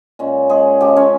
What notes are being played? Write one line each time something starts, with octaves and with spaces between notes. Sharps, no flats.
A#2 G#3 C#4
G#3 G#4
C#3 F3 G#3 G4
C#4 C#5